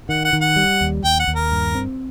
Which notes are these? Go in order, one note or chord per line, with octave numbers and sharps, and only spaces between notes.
D#3 F#5
F#5
D#3
F#5
G3
D#2
D#2 G5
F#5
D#2
A#4
G2
C4